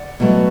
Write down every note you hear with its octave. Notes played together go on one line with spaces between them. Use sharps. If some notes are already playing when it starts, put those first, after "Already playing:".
Already playing: D5 F#5
B2 F#3 A3